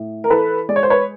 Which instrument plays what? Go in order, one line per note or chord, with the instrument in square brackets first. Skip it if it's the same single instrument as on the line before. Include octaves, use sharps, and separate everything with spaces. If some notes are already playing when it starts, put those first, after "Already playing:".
Already playing: [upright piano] A2
A#4
E3 A4 B4
G#3 D5
C#5
C5
B4 C#5